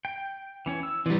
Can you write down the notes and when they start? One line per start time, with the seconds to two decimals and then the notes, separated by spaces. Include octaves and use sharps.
0.05 G5
0.66 E3 C#4 C#5
0.83 E6
1.06 E3 G3 C4 B4 D5